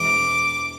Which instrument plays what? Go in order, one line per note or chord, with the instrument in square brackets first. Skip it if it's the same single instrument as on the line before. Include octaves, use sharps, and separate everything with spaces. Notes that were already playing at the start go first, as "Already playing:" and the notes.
Already playing: [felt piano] E1 [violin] D6